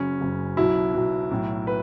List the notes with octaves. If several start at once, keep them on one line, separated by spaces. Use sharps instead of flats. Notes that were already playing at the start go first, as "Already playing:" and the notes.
Already playing: F#1 F#2 C#3 C#4
F#1 F#2 C#3
B1 B2 F#3 E4
B1 B2 F#3
B1 A2 F#3
B4